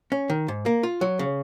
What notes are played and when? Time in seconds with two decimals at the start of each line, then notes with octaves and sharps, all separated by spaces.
0.12 C#4
0.30 D#3
0.48 G#2
0.66 A#3
0.83 F4
1.01 F#3
1.19 C#3